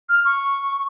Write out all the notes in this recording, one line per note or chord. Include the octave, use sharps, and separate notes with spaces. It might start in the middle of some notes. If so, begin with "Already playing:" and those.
F6
C#6